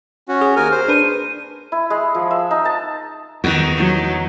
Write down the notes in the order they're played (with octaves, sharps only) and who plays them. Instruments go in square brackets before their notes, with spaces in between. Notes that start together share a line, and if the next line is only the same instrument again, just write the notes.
[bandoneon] C#4 F#4
[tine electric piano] G#4
[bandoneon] D#2 A#4 G#5 [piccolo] F6
[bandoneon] C5
[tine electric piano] D4 B4 [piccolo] D#7
[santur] E4
G#3
F3
E5
D#4
A5
[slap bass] E2 [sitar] D#3 F#4
[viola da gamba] F#3